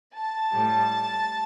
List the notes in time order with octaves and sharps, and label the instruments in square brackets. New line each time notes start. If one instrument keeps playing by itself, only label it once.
[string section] A5
A2 G3